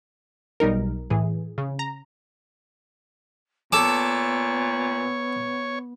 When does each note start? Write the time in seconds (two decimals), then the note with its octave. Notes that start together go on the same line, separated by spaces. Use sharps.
0.60 B1 G3 D#4 A#4
1.10 A2 E3 G#4
1.58 C#3
1.79 A#5
3.73 A#2 B3 A4 C#5 A5 D6